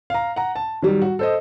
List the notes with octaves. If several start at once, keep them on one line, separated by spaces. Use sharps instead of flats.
F5 A#5
F#5 A#5
A5
D#3 F#3 G3
F#4
A4 C5 D#5